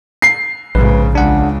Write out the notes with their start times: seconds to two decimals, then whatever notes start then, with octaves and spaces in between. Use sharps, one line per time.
0.22 C7
0.75 A#1 G#2 C#3 B4
1.15 C#2 C#3 D4 F#5